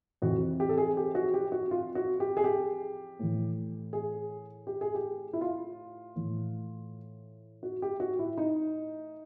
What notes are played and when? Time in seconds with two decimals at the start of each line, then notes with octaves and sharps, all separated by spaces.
0.22 F2 C3 E3 F#4
0.60 G4
0.69 A4
0.77 G#4
0.97 G4
1.15 F#4
1.34 G4
1.52 F#4
1.71 F4
1.95 F#4
2.20 G4
2.37 G#4
2.44 G4
3.19 A2 E3
3.93 G#4
4.67 G4
4.81 G#4
4.95 G4
5.33 E4
5.41 F4
6.16 A2 E3
7.63 F#4
7.82 G4
8.00 F#4
8.19 E4
8.38 D#4